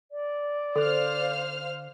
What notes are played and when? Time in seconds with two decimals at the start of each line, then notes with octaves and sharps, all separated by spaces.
0.11 D5
0.76 D3 A4 C5 F5 F6 F#6